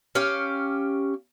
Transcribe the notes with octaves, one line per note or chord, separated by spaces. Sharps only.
C#4 G4 F5